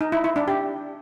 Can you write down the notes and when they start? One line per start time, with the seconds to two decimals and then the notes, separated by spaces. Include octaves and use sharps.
0.01 D#4
0.12 E4
0.24 E4
0.36 D4
0.48 G4